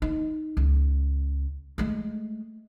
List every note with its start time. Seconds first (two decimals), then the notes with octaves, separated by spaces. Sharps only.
0.02 D#4
0.57 C#2
1.78 G#3 A3